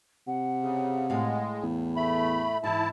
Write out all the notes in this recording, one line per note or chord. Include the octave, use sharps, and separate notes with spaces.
C3 F#5
C#3
A2 G#3 F5
E2
A3 E5 B5
G#2 E3 E4 A5